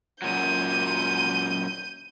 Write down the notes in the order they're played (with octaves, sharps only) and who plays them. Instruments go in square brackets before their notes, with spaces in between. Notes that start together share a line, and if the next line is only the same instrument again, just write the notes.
[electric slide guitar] F#2 A#2 F#3 [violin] G6 D#7